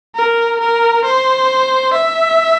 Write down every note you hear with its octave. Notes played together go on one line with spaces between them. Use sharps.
A#4
A#4
C5
E5